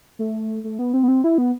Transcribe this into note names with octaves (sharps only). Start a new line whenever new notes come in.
A3
A3
B3
C4
B3
C4
E4
B3